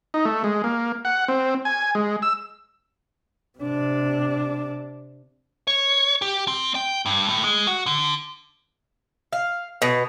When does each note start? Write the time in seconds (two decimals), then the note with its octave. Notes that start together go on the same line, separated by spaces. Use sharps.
0.14 D#4
0.25 A3
0.44 G#3
0.64 A#3
1.05 F#5
1.28 C4
1.65 G#5
1.95 G#3
2.22 E6
3.59 C3 D4
5.67 C#5
6.22 G4
6.48 C4
6.75 G5
7.06 G2
7.29 A2
7.44 G#3
7.67 F#4
7.86 D3
9.33 F5
9.82 B2